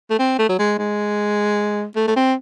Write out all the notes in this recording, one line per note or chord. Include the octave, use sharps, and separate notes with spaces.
A3
C4
A3
F#3
G#3
G#3
A3
A3
C4